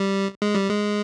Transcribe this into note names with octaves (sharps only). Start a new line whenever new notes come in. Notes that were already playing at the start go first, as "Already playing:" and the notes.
Already playing: G3
G#3
G3
G#3